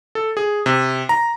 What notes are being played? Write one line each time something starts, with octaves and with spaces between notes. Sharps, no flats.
A4
G#4
C3
A#5